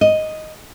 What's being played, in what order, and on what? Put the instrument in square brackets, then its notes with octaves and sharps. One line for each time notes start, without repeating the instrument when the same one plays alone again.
[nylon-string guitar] D#5